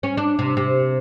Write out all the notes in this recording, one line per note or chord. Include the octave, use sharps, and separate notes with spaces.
C#4
D4
C3
C3